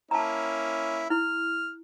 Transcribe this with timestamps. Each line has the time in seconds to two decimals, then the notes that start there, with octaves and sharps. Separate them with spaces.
0.11 A#3 C#4 E4 A5 A#5
1.10 E4 F6